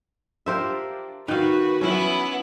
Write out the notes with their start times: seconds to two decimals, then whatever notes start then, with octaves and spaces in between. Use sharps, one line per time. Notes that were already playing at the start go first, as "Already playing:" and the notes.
0.46 D4 F4 G4 A#4 C5 E5
1.28 D#3 F#4 B4 F5 F#6
1.81 E3 F#3 B3 C#4 E4